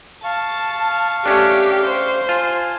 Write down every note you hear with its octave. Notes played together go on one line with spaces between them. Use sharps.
F5 A5 C#6
A3 C#4 D4 G4
C5
F4 G#5 A5